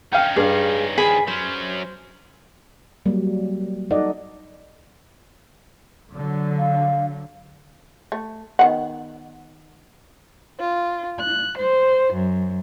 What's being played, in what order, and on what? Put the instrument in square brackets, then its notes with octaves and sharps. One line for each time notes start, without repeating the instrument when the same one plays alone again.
[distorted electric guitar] C#4 D#4 [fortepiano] F5 G5
[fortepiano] G2 [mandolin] G#4 F5
[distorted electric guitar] D#3 F3 [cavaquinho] G#4 G#5 [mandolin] B5
[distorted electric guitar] F#3 C#4 [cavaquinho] C5
[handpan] F#3 G3 A#3
D#4 A4 D5 D#5 F#5
[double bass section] D3 F#3
[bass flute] F5
[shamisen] A3
D#3 B3 F#5
[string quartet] F4
F#6
C5
F#2